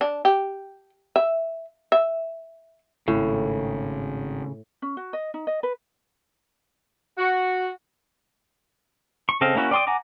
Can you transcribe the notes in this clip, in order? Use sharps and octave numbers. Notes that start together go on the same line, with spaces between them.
D4
G4
E5
E5
G#1 A2 C#3
C#4
F#4
D#5
D#4
D#5
B4
F#4
C#6
C#3 C4 A4 D#5 F5
A#3 C#4 E4 F#4
D5 G5 C6 D6 D#6
F#5 G#5 A#5 D6